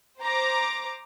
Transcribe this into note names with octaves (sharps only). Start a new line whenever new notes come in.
C5 A#5 D6